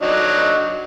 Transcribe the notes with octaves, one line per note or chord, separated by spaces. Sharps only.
F#3 D4 D#4